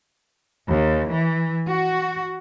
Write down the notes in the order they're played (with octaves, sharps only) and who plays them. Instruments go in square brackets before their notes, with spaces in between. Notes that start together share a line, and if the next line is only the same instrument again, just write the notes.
[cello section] D#2
E3
F#4